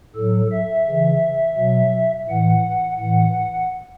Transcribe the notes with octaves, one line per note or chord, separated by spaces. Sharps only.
A2 F#3 A4
E5
C#3 E3
B2 F#3
A2 E3 F#5
A2 E3 F#5